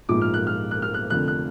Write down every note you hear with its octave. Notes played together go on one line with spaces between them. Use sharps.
A#1 G#2 F3 D6
F6
F#6
F6
F#6
F6
F#6
F1 F2 D3 F#6
F#6